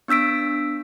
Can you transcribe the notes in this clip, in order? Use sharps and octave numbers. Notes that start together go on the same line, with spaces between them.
B3 D4 E6 B6 D7